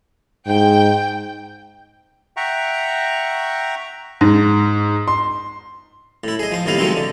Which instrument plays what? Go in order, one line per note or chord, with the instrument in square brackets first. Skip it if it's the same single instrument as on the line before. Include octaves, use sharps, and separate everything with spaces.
[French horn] G#2 [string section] G5
[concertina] E5 F#5 G5 A#5 C#6
[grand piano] G#2
C6
[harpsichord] A2 E4
G#4 D#5
F3 C5
D#2 A2 C3 E4 D#5 F5
D#3 F#3 G#3 A3 C4 D#4
D3